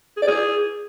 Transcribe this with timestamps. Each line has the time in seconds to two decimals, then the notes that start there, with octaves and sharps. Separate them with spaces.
0.17 G#4
0.22 D5
0.27 G#4